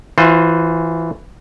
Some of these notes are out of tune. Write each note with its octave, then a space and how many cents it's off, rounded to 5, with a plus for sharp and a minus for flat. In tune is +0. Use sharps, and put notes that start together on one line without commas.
E3 +0 F4 +30 C5 +0